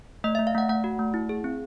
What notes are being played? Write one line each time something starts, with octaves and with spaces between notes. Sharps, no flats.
A3 D#5
A3 E5
F5
A3 F#5
A3 F#5
F#4
A3
E4
G#4
C4